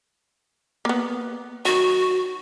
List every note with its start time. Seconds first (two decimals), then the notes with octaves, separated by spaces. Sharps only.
0.85 A#3 B3
1.65 D#3 F#3 F#4